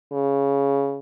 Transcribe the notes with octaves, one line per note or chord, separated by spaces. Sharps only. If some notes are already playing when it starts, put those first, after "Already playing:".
C#3